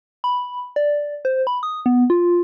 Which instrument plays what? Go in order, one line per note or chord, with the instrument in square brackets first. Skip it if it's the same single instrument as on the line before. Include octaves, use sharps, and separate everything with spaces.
[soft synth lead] B5
D5
C5
B5
D#6
B3
F4